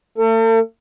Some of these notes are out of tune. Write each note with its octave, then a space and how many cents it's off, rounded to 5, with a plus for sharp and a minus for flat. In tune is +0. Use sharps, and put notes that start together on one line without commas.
A3 +45 A4 +40